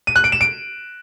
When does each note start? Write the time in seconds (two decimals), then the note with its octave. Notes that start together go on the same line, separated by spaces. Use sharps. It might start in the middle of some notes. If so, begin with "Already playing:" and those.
0.07 D#7
0.16 F#6
0.24 D7
0.32 E7
0.41 D7